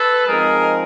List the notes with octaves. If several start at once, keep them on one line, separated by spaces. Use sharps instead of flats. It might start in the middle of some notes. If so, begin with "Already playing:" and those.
Already playing: A4 B4
F3 G#3 C4 D#4 G#4 A#4